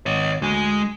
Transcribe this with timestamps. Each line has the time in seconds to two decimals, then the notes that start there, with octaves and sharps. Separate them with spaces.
0.06 G#1 C#5 D#5
0.42 D2 G#3 G#5